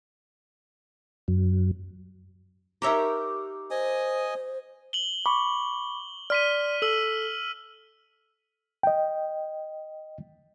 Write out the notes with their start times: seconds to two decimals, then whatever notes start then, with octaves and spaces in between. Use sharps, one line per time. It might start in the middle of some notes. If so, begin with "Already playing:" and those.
1.28 F#2
2.82 D#4 G4 A#4 C#5 E5 A#5
3.71 C5 D#5 G#5 D#6
4.93 F#7 G7
5.26 B5 C#6 D6
6.30 D5 C6 F6 B6 D#7
6.82 A4 E6 F#7
8.83 D#5 G5